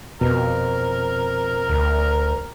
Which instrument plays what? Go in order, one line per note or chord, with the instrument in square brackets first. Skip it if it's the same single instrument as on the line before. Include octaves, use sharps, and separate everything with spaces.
[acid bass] F2 [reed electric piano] B2 [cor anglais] A#4
[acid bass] D2